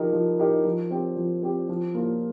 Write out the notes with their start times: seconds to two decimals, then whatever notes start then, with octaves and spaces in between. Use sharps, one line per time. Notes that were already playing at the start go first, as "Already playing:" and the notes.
Already playing: F3 D#4 G4 A#4
0.13 F3
0.39 D#4 G4 A#4
0.65 F3
0.91 C4 G4
1.17 F3
1.43 C4 G4
1.69 F3
1.95 A#3 F4 A#4